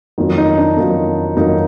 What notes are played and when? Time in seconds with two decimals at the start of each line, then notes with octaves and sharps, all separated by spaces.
0.18 F2 D#3 F#3 A#3 D#4
0.38 D#4
0.58 D4
0.77 F2 D#3 F#3 A#3 D#4
1.37 F2 D#3 F#3 A#3 D#4